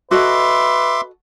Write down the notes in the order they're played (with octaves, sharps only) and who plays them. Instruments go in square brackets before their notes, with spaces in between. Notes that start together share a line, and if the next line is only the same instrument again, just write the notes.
[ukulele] F#4 A4 D#5 [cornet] B4 [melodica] E5 C6 D6